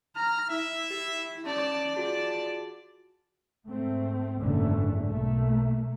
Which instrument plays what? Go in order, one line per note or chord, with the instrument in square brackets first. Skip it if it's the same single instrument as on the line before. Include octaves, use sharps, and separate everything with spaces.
[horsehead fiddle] A#5 [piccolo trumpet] F6
[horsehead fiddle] E4 [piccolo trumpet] E5
[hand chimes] G4
[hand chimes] C#4 [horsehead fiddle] D5 [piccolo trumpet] A5
[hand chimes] F4 F#4 G#4 [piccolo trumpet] A5
[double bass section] G#2 A3 C4
F#1 G#2 D3 E3 A3
B1 B2 A3 A#3